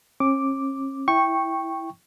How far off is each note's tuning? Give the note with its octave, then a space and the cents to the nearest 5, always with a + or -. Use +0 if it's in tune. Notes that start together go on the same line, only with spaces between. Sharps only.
C#4 -40 D6 +0
E4 +0 G5 +0 C#6 -10